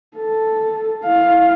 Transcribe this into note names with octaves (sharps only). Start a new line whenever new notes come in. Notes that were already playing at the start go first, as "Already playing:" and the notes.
A4
E4 F5